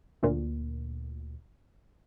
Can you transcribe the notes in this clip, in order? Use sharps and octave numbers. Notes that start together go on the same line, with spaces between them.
D2 A#2